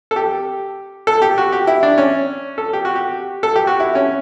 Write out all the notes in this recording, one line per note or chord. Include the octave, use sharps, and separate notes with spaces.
A4
G4
A4
G4
F#4
G4
E4
D4
C#4
A4
G4
F#4
G4
A4
G4
F#4
E4
C#4